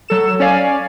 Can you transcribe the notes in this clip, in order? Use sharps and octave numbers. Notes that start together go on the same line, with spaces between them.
F#3 A4 E7
C#4 C#5 D5 F5 G#5